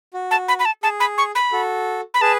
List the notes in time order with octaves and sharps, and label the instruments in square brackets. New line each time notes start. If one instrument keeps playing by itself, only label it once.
[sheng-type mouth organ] F#4
[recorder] A5
B5
B5
A5
[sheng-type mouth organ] G#4 [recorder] A5
[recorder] B5
C#6
B5
[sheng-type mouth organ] F#4 A4
[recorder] B5
[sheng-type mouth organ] G#4 B4 [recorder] A5